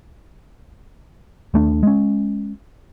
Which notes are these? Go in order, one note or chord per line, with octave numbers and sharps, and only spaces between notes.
D#2 A3 D4
G#3 C#4